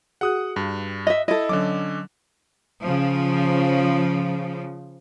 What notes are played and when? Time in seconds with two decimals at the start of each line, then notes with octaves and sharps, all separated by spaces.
0.21 F#4 G#4 F#5 D#6 F#6
0.56 G2
1.07 D#5 E5
1.28 E4 A4 D#5
1.49 D3 F#3 C#4 D6
2.82 C#3 F3